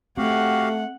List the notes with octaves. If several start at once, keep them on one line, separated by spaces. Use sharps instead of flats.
A3 C4 F#4 G4 F5 F#5